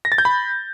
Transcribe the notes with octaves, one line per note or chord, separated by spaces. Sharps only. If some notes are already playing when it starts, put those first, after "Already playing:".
A#6
A6
G6
B5